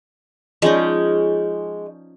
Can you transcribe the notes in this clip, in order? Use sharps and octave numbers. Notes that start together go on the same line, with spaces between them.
F3 G#3 C#4 D#4